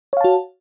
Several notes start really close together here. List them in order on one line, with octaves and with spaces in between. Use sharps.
C#5 F5 A5 F#4